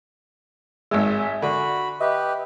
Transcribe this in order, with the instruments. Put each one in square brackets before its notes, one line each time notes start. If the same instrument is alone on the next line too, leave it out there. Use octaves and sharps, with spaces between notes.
[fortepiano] G#1 G#3 [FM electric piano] E5 G#5 B6
[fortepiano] D3 [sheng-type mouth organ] F#4 B5
[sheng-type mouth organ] G4 B4 [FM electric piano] D#5 E5